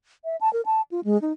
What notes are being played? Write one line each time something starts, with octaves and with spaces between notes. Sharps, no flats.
E5
A5
A#4
A5
F4
G#3
D#4